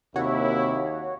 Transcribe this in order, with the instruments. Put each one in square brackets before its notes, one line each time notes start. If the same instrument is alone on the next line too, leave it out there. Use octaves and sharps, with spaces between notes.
[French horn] D#2 [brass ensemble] C3 A#3 E4 [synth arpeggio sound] F#4 C#5